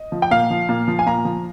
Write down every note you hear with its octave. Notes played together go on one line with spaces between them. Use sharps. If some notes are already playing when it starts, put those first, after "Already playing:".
Already playing: D#5
F3
G5
A#2 F5
F3
A#2
F3
G#5
A#2 A#5
F3